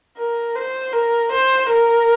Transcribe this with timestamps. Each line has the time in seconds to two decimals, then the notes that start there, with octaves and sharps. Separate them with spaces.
0.18 A#4
0.55 C5
0.93 A#4
1.32 C5
1.70 A#4